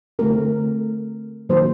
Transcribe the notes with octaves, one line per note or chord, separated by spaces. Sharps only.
D3 A3 C4 A#4
D#3 F#3 A#3 C5